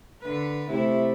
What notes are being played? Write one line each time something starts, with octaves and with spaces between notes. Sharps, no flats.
D3 B4
C3 A3 E4